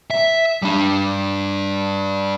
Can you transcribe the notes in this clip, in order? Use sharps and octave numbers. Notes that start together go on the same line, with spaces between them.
E5
G3 D4